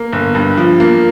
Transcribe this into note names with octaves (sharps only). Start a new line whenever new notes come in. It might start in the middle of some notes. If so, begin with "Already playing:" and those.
Already playing: A#3
G1
G2
F3
A#3